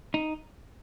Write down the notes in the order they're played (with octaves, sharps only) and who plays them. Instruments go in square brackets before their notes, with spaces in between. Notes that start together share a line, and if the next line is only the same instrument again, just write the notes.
[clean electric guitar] D#4